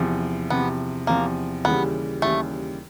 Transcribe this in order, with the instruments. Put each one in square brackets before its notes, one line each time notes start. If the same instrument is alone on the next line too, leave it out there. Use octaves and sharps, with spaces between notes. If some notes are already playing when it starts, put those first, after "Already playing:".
Already playing: [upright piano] E2 C3 F3
[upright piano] E2 C3 F3 [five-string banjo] B3
[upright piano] E2 C3 F3 [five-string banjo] A#3
[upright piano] D#2 C#3 E3 G3 [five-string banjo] B3
[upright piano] D#2 C#3 E3 G3 [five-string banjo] A3